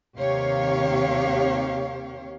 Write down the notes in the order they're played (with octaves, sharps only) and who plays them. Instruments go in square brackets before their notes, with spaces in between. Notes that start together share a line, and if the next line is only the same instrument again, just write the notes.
[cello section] D#2 C3 D#3 G4 C#5 F5